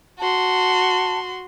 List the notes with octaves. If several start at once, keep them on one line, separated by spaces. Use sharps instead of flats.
F#4 A5 C6